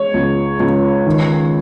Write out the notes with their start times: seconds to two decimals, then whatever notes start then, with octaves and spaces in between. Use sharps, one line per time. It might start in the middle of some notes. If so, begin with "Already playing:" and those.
Already playing: G#3 C#5
0.14 C#2
0.60 C#2
1.06 D#3